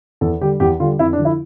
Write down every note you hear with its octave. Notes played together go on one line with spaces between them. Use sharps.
E2 A4
D3 G3 G4
E2 G4
D3 G3 F4
F2 E4
D4
D3 F3
E4